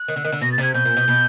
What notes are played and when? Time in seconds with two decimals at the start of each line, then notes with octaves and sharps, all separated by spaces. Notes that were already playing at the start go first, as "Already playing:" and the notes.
Already playing: F#6
0.08 D#3
0.16 D3
0.24 D#3
0.32 D3
0.41 B2 A#6
0.52 A6
0.58 C3 G#6
0.74 B2 G6
0.85 A#2
0.97 B2
1.08 B2